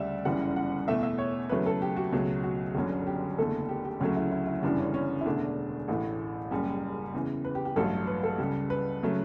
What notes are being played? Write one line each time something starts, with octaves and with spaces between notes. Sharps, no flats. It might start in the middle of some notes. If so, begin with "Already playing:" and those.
Already playing: D2 C#3 G3 D5 E5
G1 F#2 C#3 E3 G3 F#5
F#5
E2 B2 A3 E5
E5
C#5
E2 C#3 F#3 A3 B4
A4
G4
F#4
C#2 B2 F#3 A3
F#4
G1 F#2 D3 F#3
G4
F#1 E2 D3 A3 A4
G4
G4
D2 C#3 F#3 A3 C#4
E4
E4
E4
G1 F#2 C#3 E3 G3 D4
C#4
C#4
E4
E1 E2 D3 A3 D4
A1 A2 E3 A3
F#1 F#2 C#3 G3 G4
E2 C#3 E3
B4
G4
G4
A1 G2 F#3 A3 A4
B4
A4
C#2 C#3 G3
B4
C#3 F#3 A3